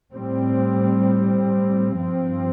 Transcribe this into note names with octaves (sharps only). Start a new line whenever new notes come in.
A2 G3 C4
G2 F3 C4